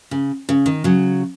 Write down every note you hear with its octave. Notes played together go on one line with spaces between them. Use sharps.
C#3
C#3
D#3
C#3 F#3